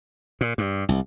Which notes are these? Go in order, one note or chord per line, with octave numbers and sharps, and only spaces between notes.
A#2
G2
C2